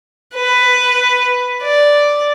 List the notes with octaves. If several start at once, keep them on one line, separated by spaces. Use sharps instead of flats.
B4
D5